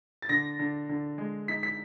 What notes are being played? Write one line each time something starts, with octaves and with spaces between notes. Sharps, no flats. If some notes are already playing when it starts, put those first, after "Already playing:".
A6
D3 A#6
D3
D3
G#3
D#4 B6
B6